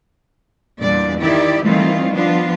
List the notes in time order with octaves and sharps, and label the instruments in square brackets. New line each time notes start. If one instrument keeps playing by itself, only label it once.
[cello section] E2 A#2 G3 D4 D5
D#3 E4 G4 D5
D#3 E3 G3 A3 C4 F4
F3 B3 D4 F4